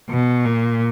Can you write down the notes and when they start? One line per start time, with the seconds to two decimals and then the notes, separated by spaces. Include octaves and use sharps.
0.09 B2
0.45 A#2